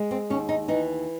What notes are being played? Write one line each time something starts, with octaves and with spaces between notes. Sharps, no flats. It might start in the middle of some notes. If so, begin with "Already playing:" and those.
Already playing: G#3
C4
D#2 C#4
D#4
E3 D#4